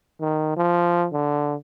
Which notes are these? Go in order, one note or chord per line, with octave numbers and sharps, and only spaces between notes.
D#3
F3
D3